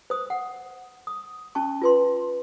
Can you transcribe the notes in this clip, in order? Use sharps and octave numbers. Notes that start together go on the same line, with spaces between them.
C5 D#6
F#5
D#6
C#4 A5 C#6
F4 B4 C6